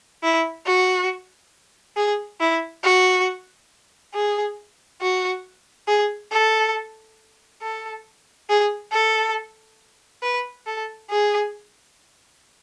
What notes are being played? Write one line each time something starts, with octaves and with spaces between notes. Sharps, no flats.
E4
F#4
G#4
E4
F#4
G#4
F#4
G#4
A4
A4
G#4
A4
B4
A4
G#4